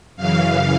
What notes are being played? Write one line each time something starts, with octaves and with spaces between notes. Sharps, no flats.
F#2 C#3 E3 F5